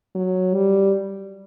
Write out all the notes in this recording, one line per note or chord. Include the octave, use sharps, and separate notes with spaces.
F#3
G3